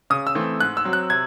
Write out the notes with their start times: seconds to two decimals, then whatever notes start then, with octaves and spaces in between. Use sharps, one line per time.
0.10 C#3 D#6
0.27 E6
0.35 E3 A3 C4
0.60 G#2 F#6
0.77 E6
0.85 F#3 C4
0.93 F#6
1.10 C3 G#6